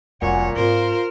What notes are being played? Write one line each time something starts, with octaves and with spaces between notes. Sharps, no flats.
F1 F#2 A#2 G3 C#5 F#5 G#5
G#2 C4 F4 A#4 C5